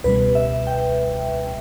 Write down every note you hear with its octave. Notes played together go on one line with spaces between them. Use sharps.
C#2 B2 G3 B4
E5
G5